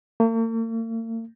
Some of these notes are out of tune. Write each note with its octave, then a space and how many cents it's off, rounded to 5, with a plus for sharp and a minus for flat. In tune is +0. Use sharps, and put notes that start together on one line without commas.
A#3 -45